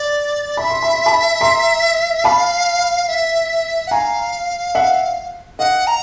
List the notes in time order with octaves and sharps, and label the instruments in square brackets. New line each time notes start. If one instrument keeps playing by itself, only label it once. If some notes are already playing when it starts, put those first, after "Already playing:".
Already playing: [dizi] D5
[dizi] E5 [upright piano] B5
[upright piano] C6
B5
C6
A5 B5
A#5 C6
[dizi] F5 [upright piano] A5 B5
[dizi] E5
F#5
[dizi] F5 [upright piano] G#5 A#5
[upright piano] E5 F#5
[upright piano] D#5 F5 [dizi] F#5
[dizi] A#5